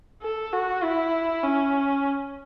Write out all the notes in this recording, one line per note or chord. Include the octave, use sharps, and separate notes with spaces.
A4
F#4
E4
C#4